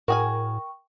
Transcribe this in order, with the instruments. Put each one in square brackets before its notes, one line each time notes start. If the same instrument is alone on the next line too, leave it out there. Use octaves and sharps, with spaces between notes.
[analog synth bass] A2 [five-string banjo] F#4 G#4 G#5 [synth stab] A#4 [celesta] G5 C#6